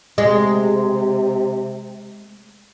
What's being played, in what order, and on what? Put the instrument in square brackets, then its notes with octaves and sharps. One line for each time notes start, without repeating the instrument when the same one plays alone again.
[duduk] C3 [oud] G#3